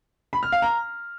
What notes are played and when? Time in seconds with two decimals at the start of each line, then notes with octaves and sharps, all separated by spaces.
0.33 B5
0.43 F6
0.52 F5
0.62 A#5